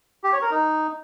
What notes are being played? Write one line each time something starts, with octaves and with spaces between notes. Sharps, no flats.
G4
C#5
A#4
D#4